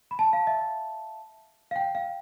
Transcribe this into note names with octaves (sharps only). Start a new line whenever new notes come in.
B5
A5
F5
E5
F5
G5
F5